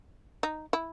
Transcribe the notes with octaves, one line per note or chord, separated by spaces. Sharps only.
D#4
E4